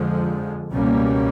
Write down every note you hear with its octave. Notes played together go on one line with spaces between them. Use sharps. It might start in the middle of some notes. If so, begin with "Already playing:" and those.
Already playing: F2 D3 F3 G#3
C#2 B2 G3 A#3 C#4